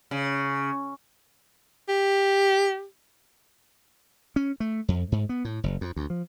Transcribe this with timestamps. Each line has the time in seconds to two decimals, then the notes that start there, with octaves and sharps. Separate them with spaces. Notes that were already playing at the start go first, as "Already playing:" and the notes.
0.11 C#3
1.89 G4
4.36 C#4
4.60 A3
4.88 F2
5.12 G#2
5.29 B3
5.45 A2
5.63 F#1
5.81 F2
5.96 D2
6.10 F3